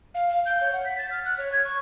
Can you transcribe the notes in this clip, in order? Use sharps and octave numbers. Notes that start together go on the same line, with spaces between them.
F5
F5
G6
C#5
F#5
B6
A6
F6
F#6
C#5
G#6
C#6